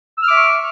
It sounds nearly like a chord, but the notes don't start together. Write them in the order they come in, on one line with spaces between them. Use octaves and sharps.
E6 F6 D6 E5 C#6